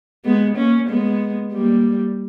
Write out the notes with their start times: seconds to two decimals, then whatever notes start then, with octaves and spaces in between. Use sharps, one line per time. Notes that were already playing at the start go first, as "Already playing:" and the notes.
0.25 G#3 B3
0.57 A#3 C#4
0.89 G#3 B3
1.53 G3 A#3